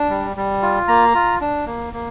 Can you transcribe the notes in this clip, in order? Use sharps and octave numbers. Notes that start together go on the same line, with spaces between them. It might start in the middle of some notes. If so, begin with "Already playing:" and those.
Already playing: D4
G3
G3
F4
A#3 A#5
F4
D4
A#3
A#3